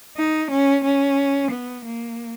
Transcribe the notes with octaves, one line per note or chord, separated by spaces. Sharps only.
D#4
C#4
C#4
B3
A#3